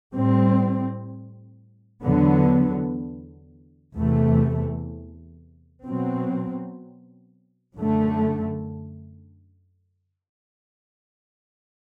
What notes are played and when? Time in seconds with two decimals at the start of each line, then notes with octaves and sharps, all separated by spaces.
0.13 A2 G3 C4
2.04 E2 D3 F#3 B3
3.94 E2 C3 E3 A3
5.85 B2 F#3 C4
7.76 F#2 D3 A3